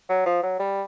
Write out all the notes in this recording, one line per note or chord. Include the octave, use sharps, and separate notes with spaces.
F#3
F3
F#3
G3